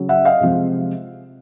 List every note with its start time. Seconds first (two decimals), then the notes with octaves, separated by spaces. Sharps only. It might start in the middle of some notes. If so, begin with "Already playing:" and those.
Already playing: C#3 F#3
0.09 E5 F#5
0.25 D#5 F5
0.40 C3 F3 G#3